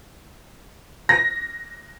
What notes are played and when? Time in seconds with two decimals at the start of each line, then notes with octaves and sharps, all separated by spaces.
1.09 A#6